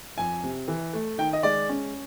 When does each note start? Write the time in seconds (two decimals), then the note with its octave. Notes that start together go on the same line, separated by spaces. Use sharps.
0.18 F2 G#5
0.44 C3
0.68 E3
0.93 A3
1.18 D#3 G5
1.33 D#5
1.43 G#3 D5
1.69 C#4